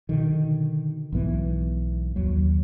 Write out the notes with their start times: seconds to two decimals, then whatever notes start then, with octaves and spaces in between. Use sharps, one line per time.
0.09 B2 D3 D#3
1.12 B1 G#2 E3 B3
2.16 D#2 F#3